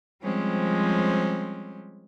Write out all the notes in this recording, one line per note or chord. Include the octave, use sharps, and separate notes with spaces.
F3 G3 G#3 C4 C#4